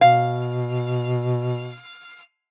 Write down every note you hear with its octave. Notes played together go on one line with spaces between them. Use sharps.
B2 F5